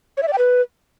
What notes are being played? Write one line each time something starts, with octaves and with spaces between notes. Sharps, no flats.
C#5
E5
D5
G5
B4